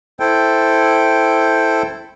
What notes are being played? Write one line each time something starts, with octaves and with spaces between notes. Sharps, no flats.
E4 A4 C5 G5